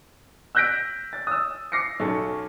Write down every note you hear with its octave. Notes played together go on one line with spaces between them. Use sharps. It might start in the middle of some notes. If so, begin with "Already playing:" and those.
E6 F#6 G6 A#6 B6 D7
A6
D#6 E6
D6 A#6 C7 C#7
B1 C#4 A4